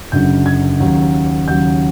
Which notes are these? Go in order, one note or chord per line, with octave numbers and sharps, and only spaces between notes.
F#1 F#2 D3 F#3 G6
G#6
D#2 C#3 F#3
D#2 C#3 F#3 G6